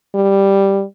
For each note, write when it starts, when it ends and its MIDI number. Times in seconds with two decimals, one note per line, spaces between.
0.15 0.83 55